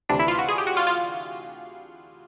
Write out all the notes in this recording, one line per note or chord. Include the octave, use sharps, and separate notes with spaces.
D2 C3 E3 D4
E4
F4
F#4
G#4
G4
F#4
F4
F4